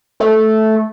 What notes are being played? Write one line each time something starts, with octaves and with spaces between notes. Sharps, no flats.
A3